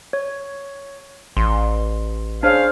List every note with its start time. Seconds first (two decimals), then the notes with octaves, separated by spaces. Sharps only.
0.13 C#5
1.37 A1 C6
2.43 C#3 D4 C5 F5